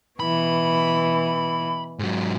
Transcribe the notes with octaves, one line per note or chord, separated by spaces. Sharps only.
B2 E3 B5
G#2 F#3